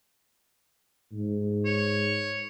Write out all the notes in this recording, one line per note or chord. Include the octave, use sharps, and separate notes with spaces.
G#2
C#5